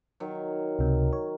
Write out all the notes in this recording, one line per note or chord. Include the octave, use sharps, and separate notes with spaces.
D#3 F#3
C#2 C3
C#5